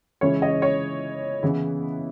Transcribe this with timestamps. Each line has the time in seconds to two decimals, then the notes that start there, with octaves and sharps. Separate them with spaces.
0.21 C#3 E3 G#3 C#4 E4 C#5
0.42 D#5
0.62 C#5
1.43 C#3 E3 B3 E4